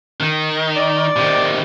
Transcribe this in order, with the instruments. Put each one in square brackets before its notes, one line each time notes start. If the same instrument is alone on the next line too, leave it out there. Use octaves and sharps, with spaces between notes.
[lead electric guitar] D#3
[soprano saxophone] D5
[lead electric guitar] C3 D#3